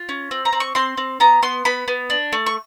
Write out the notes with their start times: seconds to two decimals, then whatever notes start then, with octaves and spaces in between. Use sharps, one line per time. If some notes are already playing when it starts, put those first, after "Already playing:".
Already playing: F4
0.09 C#4
0.31 C4
0.45 A#5
0.53 C4
0.60 C#6
0.75 C4 C6
0.97 C4
1.20 B3 A#5
1.42 B3 C6
1.65 B3 B5
1.88 B3
2.10 D4
2.33 A3
2.46 C#6